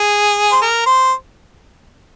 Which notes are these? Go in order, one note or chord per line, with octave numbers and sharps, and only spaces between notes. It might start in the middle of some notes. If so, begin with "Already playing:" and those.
Already playing: G#4
C5
A#4
C5